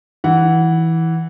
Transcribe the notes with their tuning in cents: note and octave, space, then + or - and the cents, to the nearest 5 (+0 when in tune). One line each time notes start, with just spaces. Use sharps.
E3 -10 F#5 +0